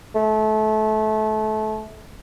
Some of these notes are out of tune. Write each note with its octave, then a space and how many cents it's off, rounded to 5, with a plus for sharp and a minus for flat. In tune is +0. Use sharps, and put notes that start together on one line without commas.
A3 -25